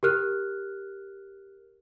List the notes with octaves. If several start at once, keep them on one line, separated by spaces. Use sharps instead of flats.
G4 A#4 F6 F#6